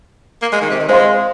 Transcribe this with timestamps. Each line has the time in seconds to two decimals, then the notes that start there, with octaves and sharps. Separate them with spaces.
0.42 A#3
0.52 G#3
0.61 D#3
0.70 C3
0.80 D#3
0.89 G#3 C5 F5 C6